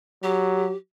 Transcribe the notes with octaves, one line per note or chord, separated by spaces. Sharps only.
F#3 G4